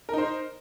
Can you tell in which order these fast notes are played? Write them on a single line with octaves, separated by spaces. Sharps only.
A#4 D#4 C5